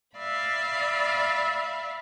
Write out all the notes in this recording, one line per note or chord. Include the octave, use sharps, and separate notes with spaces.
D5 E5 F5 B5